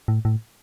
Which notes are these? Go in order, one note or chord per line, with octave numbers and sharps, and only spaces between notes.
A2
A2